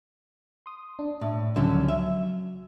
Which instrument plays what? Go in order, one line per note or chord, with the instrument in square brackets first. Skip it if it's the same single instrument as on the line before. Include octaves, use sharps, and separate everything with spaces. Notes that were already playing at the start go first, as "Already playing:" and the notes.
[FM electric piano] C6 D#6
D4
[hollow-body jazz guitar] A2
[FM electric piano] C#2 F3 E6 [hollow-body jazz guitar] D3 F#3 C#4
[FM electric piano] F#3 [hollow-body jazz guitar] E5